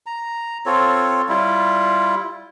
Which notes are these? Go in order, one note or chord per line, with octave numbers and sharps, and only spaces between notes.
A#5
C4 F4 A4 C#5
G3 E4 F4